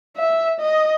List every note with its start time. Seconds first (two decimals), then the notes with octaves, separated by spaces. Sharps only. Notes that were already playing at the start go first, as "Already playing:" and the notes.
0.17 E5
0.60 D#5